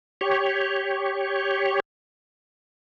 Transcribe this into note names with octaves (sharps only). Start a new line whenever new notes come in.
G4 C#5